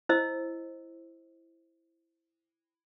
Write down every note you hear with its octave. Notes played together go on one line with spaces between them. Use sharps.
E4 C5 D#5 E6